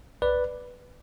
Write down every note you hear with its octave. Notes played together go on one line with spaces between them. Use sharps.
B1 B4 D5